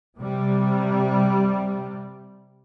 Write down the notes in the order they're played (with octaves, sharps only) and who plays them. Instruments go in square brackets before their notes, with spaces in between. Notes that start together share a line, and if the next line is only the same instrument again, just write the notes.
[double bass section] C3 G3